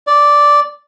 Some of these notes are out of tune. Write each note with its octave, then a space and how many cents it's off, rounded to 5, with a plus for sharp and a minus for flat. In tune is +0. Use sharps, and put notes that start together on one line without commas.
D5 -5